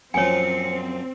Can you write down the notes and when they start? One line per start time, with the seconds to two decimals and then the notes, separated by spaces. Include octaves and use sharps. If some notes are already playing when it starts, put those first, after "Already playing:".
0.14 F#2 A#2 F3 C4 C#5 G#5 C#7